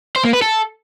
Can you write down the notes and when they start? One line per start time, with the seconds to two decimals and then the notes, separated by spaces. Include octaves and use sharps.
0.16 C5
0.24 A#3
0.33 B4
0.42 A4